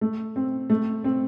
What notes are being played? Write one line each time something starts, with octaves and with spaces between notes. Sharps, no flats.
A3
C4
A3
C4